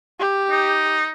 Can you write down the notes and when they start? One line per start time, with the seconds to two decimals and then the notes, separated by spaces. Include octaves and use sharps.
0.20 G4
0.50 D#4